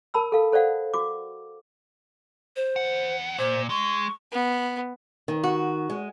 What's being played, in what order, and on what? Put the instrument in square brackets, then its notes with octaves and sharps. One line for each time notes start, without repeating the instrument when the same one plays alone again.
[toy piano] A#4 A5 B5 E6
A4 F5
A4 C5 D5 F5 F#5
F#4 D6
[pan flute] C5
[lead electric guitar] E2 F#5
[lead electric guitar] A#2 [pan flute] C5
[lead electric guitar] G#3 [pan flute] C#6
[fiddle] B3
[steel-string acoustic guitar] D#3
[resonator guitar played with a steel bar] F#4
[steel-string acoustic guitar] G#3